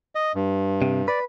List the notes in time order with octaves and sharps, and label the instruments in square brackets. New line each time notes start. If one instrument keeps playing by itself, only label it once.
[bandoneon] D#5
G2
[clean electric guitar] C3
[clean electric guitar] B4 [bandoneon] D5